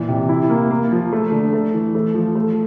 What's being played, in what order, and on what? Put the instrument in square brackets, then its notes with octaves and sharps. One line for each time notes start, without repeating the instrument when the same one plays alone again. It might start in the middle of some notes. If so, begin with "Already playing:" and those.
Already playing: [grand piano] A#2 E3
C3
E4
A#3
A#3
F3
A3
D3
A3
E3
A3
F3
A3